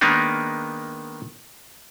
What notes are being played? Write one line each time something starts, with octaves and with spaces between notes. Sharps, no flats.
D#3 G#3 A#3 B3 D4 D#4